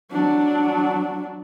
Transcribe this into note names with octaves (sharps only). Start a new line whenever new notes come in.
F#3 D4